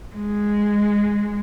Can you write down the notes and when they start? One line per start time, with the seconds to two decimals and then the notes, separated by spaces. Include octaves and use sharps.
0.16 G#3